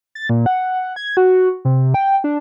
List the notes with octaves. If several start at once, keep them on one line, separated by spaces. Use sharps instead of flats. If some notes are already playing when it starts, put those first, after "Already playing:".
A6
A#2
F#5
G#6
F#4
C3
G5
D4